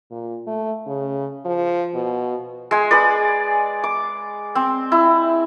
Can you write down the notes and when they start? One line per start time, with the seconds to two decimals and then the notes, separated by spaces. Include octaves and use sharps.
0.11 A#2
0.47 A3
0.86 C#3
1.45 F3
1.95 B2
2.71 G#3 G#5
2.91 G#4 B4 D5
3.84 D6
4.55 C4
4.92 E4